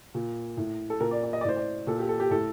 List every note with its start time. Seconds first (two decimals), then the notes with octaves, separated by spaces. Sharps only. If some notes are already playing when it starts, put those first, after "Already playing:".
0.14 A#2
0.57 A2
0.90 A4
1.00 A#2 A#4
1.11 D5
1.23 D5
1.33 D#5
1.41 D5
1.45 A2 C5
1.56 D5
1.87 A#2 A4
1.99 G4
2.09 A4
2.20 G4
2.31 A2 A4